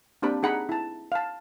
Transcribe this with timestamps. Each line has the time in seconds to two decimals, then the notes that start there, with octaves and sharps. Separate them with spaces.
0.22 A#3 C4 D4 G4 B5
0.43 D#4 G#4 F#5 A#5 B5
0.69 E4 A5
1.12 F5 A5